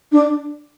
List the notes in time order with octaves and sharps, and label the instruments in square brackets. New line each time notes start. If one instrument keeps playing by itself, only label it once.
[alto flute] D4